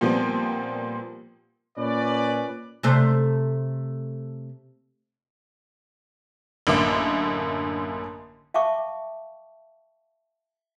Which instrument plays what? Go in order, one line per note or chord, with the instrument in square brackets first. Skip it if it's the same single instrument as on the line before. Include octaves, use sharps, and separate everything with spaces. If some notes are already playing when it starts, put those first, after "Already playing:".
[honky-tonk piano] A#2 F3 G3 B3 C4
[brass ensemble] A#2 C#4 B4 D5
[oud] C3 A3 C5
[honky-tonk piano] A1 F#2 D3 A#3 E5 D6
[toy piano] E5 F5 G5 A5 C#6 D6